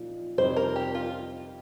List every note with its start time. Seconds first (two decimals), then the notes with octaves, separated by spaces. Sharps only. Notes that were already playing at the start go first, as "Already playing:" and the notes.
Already playing: A#2 F3 D#4
0.38 F2 C3 G3 C4 D#4 C5
0.56 A#4
0.76 G4
0.95 F4